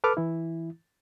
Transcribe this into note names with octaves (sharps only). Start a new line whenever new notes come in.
A4 B4 D6 F6
E3 E4